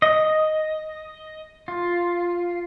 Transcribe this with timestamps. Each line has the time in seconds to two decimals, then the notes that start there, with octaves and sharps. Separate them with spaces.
0.02 D#5
1.68 F4